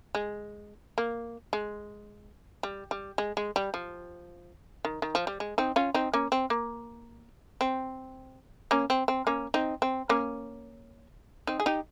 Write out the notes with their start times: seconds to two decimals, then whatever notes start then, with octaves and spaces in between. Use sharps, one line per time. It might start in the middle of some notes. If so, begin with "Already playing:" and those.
0.15 G#3
0.98 A#3
1.53 G#3
2.63 G3
2.91 G3
3.18 G#3
3.37 G#3
3.56 G3
3.74 F3
4.85 D#3
5.02 D#3
5.15 F3
5.27 G3
5.40 G#3
5.58 C4 D#4
5.76 C#4 F4
5.94 C4 D#4
6.13 A#3 C#4
6.32 C4
6.50 A#3
7.61 C4
8.71 A#3 C#4
8.90 C4
9.08 C4
9.27 A#3 C#4
9.54 C4 D#4
9.82 C4
10.09 A#3 C#4
11.47 C4 D#4
11.60 G#4
11.66 D#4 G4